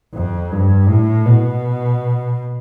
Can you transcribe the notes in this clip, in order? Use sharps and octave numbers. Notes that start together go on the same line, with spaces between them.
F2
G2
A2
B2